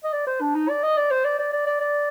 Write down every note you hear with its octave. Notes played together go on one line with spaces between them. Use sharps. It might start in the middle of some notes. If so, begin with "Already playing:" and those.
D#5
D5
C5
D4
D#4
D5
D#5
D5
C5
D5
D5
D5
D5
D5